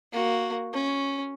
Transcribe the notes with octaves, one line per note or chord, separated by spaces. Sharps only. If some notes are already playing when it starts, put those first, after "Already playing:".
A#3 F#4
C#4